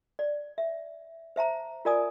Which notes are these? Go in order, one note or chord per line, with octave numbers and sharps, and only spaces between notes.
D5
E5
C5 E5 A5 A#5
F4 A#4 D5 G#5 D#6